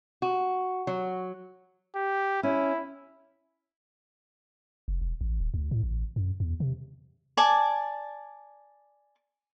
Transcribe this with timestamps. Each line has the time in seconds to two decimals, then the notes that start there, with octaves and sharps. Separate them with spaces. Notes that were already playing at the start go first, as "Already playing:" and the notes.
0.22 F#4
0.87 F#3
1.95 G4
2.43 C#4 E4
4.88 F1
5.01 E1
5.21 A1
5.41 D1
5.54 D2
5.71 A2
5.83 A1
6.16 F#2
6.40 E2
6.60 C3
7.37 D5 G#5 A5